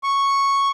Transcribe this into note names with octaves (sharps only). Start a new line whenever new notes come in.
C#6